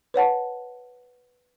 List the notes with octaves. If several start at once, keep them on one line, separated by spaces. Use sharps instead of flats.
B4 C#5 F#5 A5